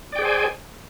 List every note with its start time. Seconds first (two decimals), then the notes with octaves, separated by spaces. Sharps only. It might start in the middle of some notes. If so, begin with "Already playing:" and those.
0.12 D5
0.16 G5
0.19 G#4
0.22 C5
0.25 G#5